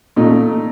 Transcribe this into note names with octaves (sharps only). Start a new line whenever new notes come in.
A#2 A3 D#4